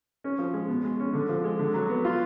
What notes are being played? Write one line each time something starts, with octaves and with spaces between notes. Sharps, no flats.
C#4
F3
G#3
B2
G#3
C#4
D3
F3
G#3
D3
F#3
B3
F4